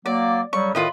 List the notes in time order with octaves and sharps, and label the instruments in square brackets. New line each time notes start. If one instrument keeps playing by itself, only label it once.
[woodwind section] F#3 A#3 [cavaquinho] D5
[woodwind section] C#3 F#3 G3 [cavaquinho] C#6
[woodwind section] A2 D#3 [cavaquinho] F4 B4 D#5